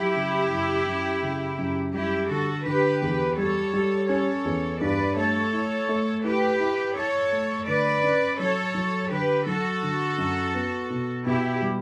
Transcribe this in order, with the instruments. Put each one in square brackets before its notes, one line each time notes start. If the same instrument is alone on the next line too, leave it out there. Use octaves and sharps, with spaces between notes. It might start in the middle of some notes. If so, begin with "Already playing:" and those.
Already playing: [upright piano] F#3 [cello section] E4 G4
[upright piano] C#3
F#2
F#2
C#3
F#2
[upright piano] G3 [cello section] E4 G4
[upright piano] D3 [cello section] F#4 A4
[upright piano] D3 [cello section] G4 B4
[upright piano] E2
[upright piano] G3 [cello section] A4 C#5
[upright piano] G3
[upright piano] C#4 [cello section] A4 C#5
[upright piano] E2
[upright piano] G2 [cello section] B4 D5
[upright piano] A3 [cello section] A4 C#5
[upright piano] E4
A3
[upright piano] E4 [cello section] G4 B4
[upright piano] E4
[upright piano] E4 [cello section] A4 C#5
[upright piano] A3
[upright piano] D3 [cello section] B4 D5
[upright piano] C#4
[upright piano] F#3 [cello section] A4 C#5
[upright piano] F#3
[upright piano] D3 [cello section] G4 B4
[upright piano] F#3 [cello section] F#4 A4
[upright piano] D3
F#2
B3
B2
[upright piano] B2 [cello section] E4 G4
[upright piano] G3